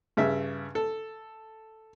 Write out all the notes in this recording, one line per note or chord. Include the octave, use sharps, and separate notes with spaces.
G2 C#3 E5
A4